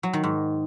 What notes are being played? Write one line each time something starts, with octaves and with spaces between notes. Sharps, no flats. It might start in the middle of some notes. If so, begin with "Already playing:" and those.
F#3
D#3
G#2